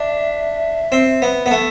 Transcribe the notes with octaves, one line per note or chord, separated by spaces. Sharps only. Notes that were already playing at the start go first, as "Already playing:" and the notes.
Already playing: D4 E5
C4
B3
B3
A3